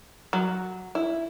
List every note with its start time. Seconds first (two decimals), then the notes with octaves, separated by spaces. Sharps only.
0.33 F#3
0.95 E4